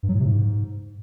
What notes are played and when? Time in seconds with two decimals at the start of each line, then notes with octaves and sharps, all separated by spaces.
0.03 G2
0.08 F#3
0.14 A2
0.20 C3
0.25 G#2